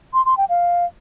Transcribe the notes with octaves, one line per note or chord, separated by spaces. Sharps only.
C6
C6
G5
F5